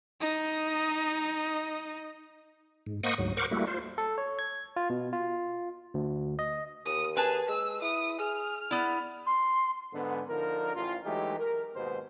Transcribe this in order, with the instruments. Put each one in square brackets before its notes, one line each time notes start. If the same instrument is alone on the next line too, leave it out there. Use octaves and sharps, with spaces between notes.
[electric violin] D#4 D#5
[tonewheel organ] G#2
A#3 C5 D#5 F#5 C#6 D#6
D2 G#2 F#3
A#4 C5 F#5 C#6 D6
G3 A3 A#3 E4 F#4
F4 C5
[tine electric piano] A4
C#5
G#6
F4
B2
F4
D2
D#5
[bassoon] D#2 [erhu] D#6
[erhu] G#4 [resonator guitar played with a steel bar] B4 A5
[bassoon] G#3 [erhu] E6
[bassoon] E4 [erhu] D#6
[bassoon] G#4 [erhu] F6
[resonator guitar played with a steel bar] B3 E4 [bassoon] D4
[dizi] C6
[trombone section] G#2 D3 B3
D3 F3 D#4 A#4
A1 F4
E3 F#3 G#3 A3 D#4 G4
A#4
D#2 G#2 B2 B3 C5